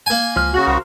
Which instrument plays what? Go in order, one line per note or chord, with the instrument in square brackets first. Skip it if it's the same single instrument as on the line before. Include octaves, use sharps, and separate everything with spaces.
[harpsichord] A#3 G#5
[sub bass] C#2 [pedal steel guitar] F3 F6
[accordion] C#3 F#4 [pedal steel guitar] F#5
[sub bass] C2 [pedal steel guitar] A#4 C5